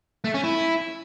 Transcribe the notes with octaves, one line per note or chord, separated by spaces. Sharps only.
A3
C#4
E4